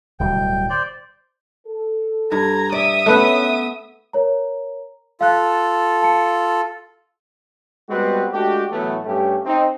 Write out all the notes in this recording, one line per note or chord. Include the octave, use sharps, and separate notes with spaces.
D1 B2 G3 G5
C5 D5
A4
G2 A#5 G#6
D5 E5 D#6
A3 B3 C#4 B4
A#4 C#5 A#5
F4 A4 F5 F#6
A5 C#7
G3 G#3 B3 C4 F#4 B4
G#3 A3 D4 F#4 G4
A2 E3 F#3 A3 B3 E4
G2 A3 C#4 G4
C4 D#4